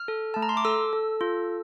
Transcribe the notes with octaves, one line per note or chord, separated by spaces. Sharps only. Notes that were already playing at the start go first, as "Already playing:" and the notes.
Already playing: F6
A4
A3 A5
A#5
C6
D6
A4 E6
A4
F4